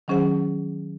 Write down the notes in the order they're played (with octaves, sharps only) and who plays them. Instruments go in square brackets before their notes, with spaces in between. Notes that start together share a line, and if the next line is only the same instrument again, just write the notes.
[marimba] D#3 F#3 C#4 G#4 C5 F#5